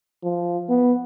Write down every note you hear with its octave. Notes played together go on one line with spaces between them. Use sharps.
F3
B3